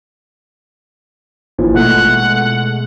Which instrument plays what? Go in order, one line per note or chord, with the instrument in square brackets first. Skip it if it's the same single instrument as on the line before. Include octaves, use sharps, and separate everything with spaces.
[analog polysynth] G#1 [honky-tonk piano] A#2 E3 F3
[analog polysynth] B2 G#3 [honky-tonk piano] A3 [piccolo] F#5